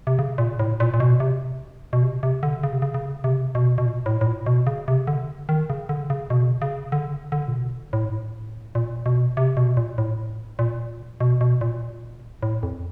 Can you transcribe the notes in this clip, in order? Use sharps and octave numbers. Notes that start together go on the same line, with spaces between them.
C3
C#3
A#2
A2
A#2
A#2
B2
C3
B2
C3
C3
D3
C#3
C3
C#3
C#3
C3
B2
B2
A#2
A2
A2
A#2
B2
C#3
C3
D3
D#3
C#3
D3
C#3
B2
C#3
D3
D3
A#2
B2
A2
G#2
A2
A#2
B2
C3
B2
A#2
A2
A#2
B2
B2
A#2
A2
F2